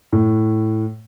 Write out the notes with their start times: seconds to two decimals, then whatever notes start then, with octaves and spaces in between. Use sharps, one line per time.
0.12 A2